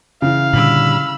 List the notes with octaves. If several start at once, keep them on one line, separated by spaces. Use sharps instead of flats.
C#3 E3 F5
A#2 D3 G3 B5 E6